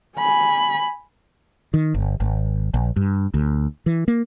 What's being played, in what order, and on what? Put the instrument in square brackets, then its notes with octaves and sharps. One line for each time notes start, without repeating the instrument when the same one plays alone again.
[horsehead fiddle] G#5 B5
[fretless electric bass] D#3
G1
G#1
A#1
G2
D2
E3
A#3